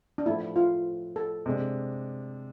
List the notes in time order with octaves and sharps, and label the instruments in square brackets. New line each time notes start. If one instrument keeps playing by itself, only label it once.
[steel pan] D4
[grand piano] A2 F3 A3 [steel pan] E4
[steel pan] F4
A4
[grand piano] C3 G#3 D4